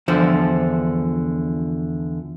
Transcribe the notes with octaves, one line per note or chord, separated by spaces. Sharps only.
E2 D3 F3 C5